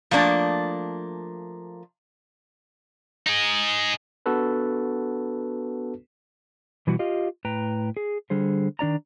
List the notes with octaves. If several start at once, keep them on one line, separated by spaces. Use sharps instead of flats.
F3 A3 A#3 D4
D#4 G#4
B3 D4 F#4 A4 B4
B2 E3 G3 F#4
F4 G4 D#5 F5
A2 B4 G5 A#5
G#4
D3 G3 G#4 C5
D#3 D4 D5 A#5